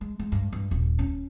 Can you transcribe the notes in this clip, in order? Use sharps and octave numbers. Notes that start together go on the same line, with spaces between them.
G#3
G#3
G2
G2
D#1
C#4